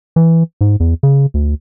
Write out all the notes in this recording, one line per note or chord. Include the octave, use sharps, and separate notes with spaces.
E3
G#2
E2
C#3
D2